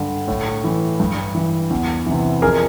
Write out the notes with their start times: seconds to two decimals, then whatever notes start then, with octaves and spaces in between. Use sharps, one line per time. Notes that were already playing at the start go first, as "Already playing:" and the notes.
Already playing: G2 D3
0.28 A2
0.64 E3
1.00 G2
1.35 E3
1.70 E2
2.06 C3 E3
2.42 F2 G#4 A#4